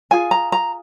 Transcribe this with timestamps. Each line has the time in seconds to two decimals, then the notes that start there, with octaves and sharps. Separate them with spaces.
0.11 F4 G#4 G#5
0.31 A#5
0.52 A#5